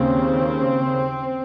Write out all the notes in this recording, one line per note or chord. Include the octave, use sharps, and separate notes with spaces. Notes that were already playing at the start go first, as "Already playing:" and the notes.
Already playing: D#2 C#3 C4